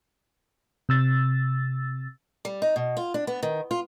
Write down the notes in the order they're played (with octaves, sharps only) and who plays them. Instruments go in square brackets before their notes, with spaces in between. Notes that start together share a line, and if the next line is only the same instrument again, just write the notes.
[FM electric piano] C3 E6 A6
[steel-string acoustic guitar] G3
D#4
B2
F4
D4
B3
D#3
F4